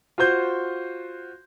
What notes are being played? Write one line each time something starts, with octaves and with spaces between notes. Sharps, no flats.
F4 F#4 C5 G6